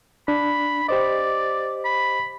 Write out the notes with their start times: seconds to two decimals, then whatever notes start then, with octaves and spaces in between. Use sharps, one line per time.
0.28 D4 B5
0.89 G4 C5 D5 D#5
1.85 B5